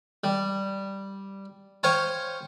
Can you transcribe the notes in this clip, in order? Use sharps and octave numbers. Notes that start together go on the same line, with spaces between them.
G3
C5 C#5 F5 G5 G#5 C#6